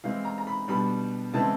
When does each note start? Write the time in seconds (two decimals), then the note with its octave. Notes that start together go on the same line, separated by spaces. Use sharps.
0.04 E3 G#3 C4 F5
0.25 A#5
0.38 A#5
0.47 B5
0.68 B2 G3 B3 D4 B5
1.32 C#3 E3 G#3 C4 A5